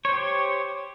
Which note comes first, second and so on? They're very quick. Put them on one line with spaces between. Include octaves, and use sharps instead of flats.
C#5 C5 G4